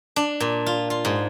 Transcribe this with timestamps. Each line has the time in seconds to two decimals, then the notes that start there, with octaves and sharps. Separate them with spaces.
0.16 D4
0.40 A#2
0.66 F4
0.90 F4
1.05 G#2